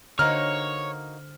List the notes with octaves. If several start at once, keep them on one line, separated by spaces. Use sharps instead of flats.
D3 A#3 D#4 F#4 C5 C#5 F6